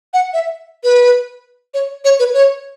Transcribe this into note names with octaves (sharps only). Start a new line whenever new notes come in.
F#5
E5
B4
C#5
C#5
B4
C#5